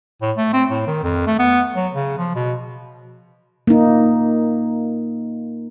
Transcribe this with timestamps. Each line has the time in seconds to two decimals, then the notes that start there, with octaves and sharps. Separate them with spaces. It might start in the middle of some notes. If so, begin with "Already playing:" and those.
0.22 A2
0.37 A3
0.53 C4
0.69 A2
0.87 D#3
1.04 F2
1.27 A3
1.39 B3
1.75 F#3
1.93 C#3
2.18 F3
2.36 B2
3.67 A#3 D#4